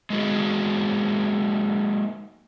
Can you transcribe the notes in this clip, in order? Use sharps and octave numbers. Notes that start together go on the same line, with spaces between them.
G#3 A#3 D#4 F#4 G#4